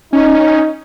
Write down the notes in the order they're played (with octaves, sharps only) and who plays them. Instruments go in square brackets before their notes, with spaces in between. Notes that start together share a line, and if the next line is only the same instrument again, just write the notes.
[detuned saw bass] C#4 [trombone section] D#4